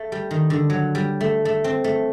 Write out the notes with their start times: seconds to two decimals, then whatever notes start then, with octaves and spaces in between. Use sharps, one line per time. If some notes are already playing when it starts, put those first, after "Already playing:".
Already playing: A3
0.12 G3
0.31 D#3
0.50 D3
0.70 F#3
0.95 G3
1.21 A3
1.45 A3
1.64 C4
1.84 A3